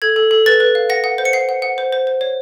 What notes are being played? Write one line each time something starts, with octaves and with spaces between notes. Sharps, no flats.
A4 G#6
A4
A4
B4 A6
B4
F5
F#5 A#6
F#5
C5
C#7
F#5 C7
F#5
F#5
C5
C5
C5
C#5